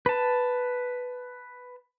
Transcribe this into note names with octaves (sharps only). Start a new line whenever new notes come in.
B4 A5